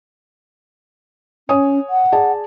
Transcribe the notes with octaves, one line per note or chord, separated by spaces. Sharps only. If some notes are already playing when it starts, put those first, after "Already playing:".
C#4 C#5 G#5 D#6
F#5
G#4 D5 A5